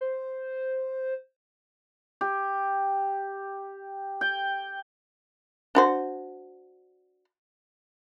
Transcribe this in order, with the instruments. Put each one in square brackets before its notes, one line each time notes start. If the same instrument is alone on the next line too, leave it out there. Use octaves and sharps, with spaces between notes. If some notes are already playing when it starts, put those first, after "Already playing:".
[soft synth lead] C5
[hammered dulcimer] G4
G5
[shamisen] D4 F#4 C5